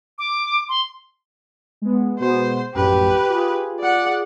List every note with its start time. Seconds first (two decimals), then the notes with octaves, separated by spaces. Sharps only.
0.19 D6
0.69 C6
1.82 G#3 B3
2.20 B2 G#3 B3 C5
2.75 A#1 F#2 A2 G4 B4
3.29 F4 G#4
3.80 D5 F#5